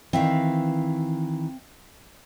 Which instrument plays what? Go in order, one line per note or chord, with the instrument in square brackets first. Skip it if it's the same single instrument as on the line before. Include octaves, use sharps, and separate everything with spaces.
[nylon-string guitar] D#3 E3 [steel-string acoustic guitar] C4 E5 F5